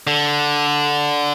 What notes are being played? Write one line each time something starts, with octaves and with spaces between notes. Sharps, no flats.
D3